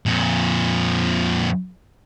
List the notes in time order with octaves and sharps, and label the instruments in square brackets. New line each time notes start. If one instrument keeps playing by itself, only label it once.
[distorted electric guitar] F2 A#2